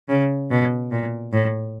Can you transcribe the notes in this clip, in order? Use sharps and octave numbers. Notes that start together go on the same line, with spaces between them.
C#3
B2
A#2
A2